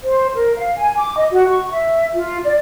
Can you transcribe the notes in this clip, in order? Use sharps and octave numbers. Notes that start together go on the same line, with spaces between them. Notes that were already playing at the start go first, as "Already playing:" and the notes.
C5
A#4
F5
G#5
D6
D#5
F#4
C#6
E5
F4
D5